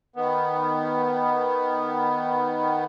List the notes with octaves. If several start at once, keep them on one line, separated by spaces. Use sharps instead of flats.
D#3 B3